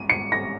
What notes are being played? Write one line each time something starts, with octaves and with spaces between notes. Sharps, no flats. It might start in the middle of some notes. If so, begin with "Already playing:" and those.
Already playing: D#7
C#7
A#6